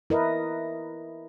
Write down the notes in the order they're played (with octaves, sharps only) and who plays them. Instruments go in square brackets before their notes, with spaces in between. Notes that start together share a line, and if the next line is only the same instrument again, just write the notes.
[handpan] E4 A#4 B4 D#5